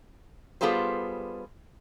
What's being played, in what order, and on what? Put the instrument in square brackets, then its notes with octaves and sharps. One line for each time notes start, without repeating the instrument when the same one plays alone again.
[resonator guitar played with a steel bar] G3 B3 F4 G#4 A4 C5